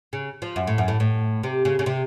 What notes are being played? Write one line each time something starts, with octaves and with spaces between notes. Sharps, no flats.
C#3
F3
F#2
A2
F#2
A2
A2
C3
C#3
C#3
C3